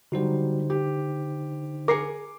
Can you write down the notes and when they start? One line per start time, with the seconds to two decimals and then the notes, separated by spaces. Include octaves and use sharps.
0.12 D3 F#3 G3 D#4 C5
0.70 G4
1.88 G#4 A#4 D6 C7 C#7